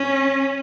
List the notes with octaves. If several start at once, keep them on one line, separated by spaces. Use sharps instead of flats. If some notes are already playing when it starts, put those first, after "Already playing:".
Already playing: C#4